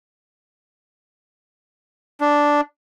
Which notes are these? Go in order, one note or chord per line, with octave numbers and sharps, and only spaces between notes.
D4